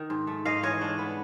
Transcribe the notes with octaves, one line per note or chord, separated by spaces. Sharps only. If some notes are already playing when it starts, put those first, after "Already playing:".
Already playing: D#3
G#2
A3
G#2 D#5 F5
E3 C#5 D#5
D4
B3